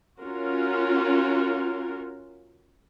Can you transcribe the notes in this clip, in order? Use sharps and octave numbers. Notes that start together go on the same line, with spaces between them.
C#4 F4 F#4 A#4